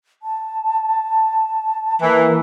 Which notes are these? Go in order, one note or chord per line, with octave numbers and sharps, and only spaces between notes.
A5
E3 A#3